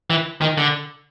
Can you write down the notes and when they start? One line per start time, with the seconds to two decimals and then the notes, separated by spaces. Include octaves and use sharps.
0.10 E3
0.42 D#3
0.58 D3